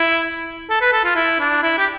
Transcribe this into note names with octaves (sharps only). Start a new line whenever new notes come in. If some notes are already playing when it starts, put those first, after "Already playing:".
Already playing: E4
A4
B4
A4
F4
E4
D4
E4
G4